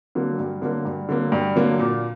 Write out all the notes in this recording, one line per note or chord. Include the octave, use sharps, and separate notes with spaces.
D3 F#3 A#3
G2
D3 F#3 A#3
G2
D3 F#3 A#3
G2
D3 F#3 A#3
A#2